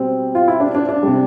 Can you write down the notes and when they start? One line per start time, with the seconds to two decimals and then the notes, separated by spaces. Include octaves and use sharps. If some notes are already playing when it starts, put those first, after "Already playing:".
Already playing: B2 G3 C4
0.35 F4
0.48 E4
0.60 D4
0.75 D4
0.89 D4
1.03 C3 G3